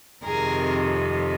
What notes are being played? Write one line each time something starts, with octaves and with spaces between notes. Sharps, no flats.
F2 C3 D#3 G#4 A#4